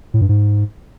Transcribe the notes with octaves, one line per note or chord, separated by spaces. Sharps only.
A2
G2
G#2